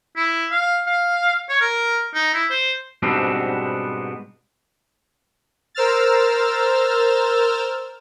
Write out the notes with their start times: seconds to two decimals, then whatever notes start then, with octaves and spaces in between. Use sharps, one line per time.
0.16 E4
0.51 F5
0.87 F5
1.49 C#5
1.61 A#4
2.14 D#4
2.33 E4
2.50 C5
3.03 G#2 B2 G3 B3 C4 D4
5.75 A#4 C5 E6 F6 A6